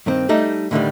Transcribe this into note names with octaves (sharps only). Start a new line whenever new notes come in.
G2 D#3 C4
G3 A3 D#4 A4
A2 D3 D#3 G3